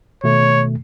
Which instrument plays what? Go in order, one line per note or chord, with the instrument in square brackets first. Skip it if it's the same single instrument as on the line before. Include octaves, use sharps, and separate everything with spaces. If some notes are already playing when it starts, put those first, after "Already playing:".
[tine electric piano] B2 D#3 A3 [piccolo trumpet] C#5